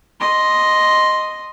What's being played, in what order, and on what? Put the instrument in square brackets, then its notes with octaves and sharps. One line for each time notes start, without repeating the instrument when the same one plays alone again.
[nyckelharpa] D#5 C6